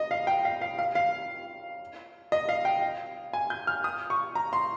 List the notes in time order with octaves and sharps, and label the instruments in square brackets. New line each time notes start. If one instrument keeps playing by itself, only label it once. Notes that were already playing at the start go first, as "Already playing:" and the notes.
Already playing: [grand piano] D#5
F5
G5
F5
F5
F5
F5
D#5
F5
G5
G#5
G6
F6
D#6
C#6
A#5
C6